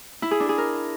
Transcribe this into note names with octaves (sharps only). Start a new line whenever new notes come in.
E4
G#4
D4
G#4
A#4